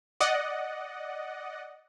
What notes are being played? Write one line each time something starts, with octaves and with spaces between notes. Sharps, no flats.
D5 D#5 F#5